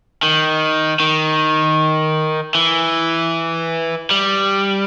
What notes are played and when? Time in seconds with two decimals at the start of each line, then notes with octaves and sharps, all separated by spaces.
0.23 D#3
1.00 D#3
2.55 E3
4.11 G3